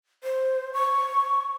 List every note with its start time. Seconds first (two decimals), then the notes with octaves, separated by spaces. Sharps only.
0.24 C5
0.74 C#6